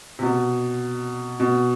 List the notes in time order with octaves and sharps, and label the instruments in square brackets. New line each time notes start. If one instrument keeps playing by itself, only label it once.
[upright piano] C3
B2
B2